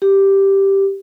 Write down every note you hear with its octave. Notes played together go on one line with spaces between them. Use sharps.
G4